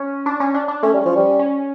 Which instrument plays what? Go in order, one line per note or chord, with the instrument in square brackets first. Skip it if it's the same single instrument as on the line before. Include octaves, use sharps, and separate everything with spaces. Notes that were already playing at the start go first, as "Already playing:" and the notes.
Already playing: [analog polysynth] C#4
D4
C#4
D4
D4
[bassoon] A3 [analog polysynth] C#4
[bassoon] G3
F3
G3
[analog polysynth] C#4